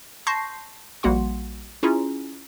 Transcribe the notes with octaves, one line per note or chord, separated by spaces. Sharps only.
A5 C6 C#6 G6 A#6 C7
A#1 G3 A#3 F#4 F#5 C6
C#4 E4 F4 G#4 A#5